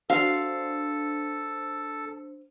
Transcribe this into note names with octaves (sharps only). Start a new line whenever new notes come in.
D4 F#4 A4 C5 F5